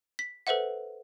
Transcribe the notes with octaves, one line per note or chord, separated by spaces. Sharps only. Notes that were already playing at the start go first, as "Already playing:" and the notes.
B6
A4 B4 C5 E5 F#5